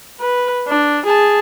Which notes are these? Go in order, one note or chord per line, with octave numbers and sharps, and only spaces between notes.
B4
D4
G#4 A5